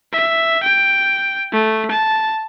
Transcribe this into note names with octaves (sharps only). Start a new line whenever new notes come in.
E5
G5
A3
A5